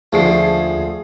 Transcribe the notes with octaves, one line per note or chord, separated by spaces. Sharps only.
D#2 D3 F3 A3 G#4 C7